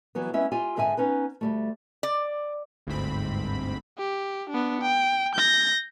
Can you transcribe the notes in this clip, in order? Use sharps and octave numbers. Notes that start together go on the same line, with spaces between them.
E3 F#3 G3 B3
G#3 B3 C#4 E4 E5
F4 G4 G#5
G#2 D3 G#4 E5 G#5
B3 C#4 D#4 B4
D2 G3 A3
D5
G1 D2 G#2 C4 B5
G4
B3 D4
G5
G6 A#6